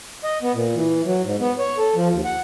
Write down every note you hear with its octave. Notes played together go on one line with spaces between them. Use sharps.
D#5
B3
A#2
E3
F#3
G#2
B3
C#5
A4
F3
D#2
F#5